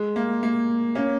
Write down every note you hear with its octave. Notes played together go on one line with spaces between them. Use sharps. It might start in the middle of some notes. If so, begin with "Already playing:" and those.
Already playing: G#3
A#3
A#3
A#3 C#4